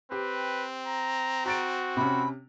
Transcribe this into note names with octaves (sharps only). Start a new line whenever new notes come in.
C4 G4 B4
A#5
F#4 A#5 A6 D7
C3 C#4 B5